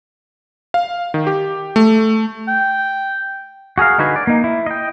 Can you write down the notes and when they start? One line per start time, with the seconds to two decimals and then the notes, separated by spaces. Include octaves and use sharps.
0.74 F5
1.14 D#3
1.27 G4
1.76 A3
2.48 G5
3.78 F#4 G#4 A#4 F5
3.98 D3 D#4 F#4 B4 G#5
4.16 D5
4.27 A#3 D#4
4.44 E4
4.66 D#5 G5